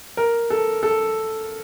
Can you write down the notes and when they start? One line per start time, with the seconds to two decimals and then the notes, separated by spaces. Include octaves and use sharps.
0.17 A#4
0.50 A4
0.83 A4